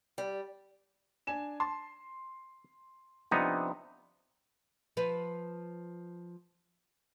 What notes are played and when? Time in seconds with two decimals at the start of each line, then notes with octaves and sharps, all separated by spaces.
0.18 G3
1.27 D4 G#5 E7
1.60 A5 C6
3.31 C3 F3 B3 D4 D#4 D#6
4.97 F3 B4